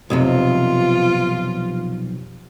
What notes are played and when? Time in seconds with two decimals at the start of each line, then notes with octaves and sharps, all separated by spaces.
0.10 B1 F2 C3 F3 F4